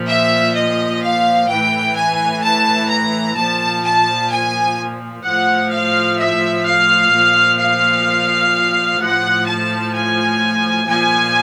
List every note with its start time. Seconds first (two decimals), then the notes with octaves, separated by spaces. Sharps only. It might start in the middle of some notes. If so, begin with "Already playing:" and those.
Already playing: A#2 F3
0.08 E5
0.55 D#5
1.03 F5
1.49 A2 E3 G5
1.96 G#5
2.43 A5
2.90 A#5
3.37 A#2 F3 A5
3.83 A5
4.30 G#5
5.24 A2 F3 F#5
5.71 F5
6.18 E5
6.65 F5
7.11 A#2 F3
7.58 F5
8.99 A2 F3 F#5
9.45 A5
9.93 G#5
10.87 A#2 F3 G#5